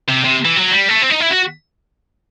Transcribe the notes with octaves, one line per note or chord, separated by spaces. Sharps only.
C3
C3
E3
F#3
G3
A3
C4
D#4
E4
F#4